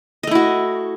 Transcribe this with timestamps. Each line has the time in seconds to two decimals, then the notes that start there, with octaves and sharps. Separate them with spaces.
0.23 D#5
0.27 A3
0.31 E4
0.35 F#4